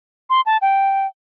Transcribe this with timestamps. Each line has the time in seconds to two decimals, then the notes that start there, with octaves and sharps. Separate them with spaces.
0.30 C6
0.46 A5
0.62 G5